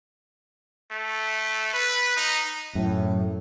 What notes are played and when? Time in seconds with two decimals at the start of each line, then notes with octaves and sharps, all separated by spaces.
0.91 A3
1.73 B4
2.17 D#4
2.75 F#2 A2